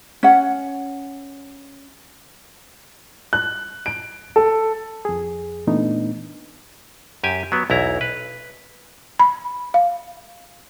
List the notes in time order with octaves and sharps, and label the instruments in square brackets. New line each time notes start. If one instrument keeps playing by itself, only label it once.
[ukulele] C#4 F#5
[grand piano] F#6
D7
A4
[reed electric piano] F2 G#4
A#2 E3 A3 B3 D4 D#4
[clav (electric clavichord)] F#2 G4 G#5
F#3 B3
B1 E2 E4 A#5
B4
[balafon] B5
F5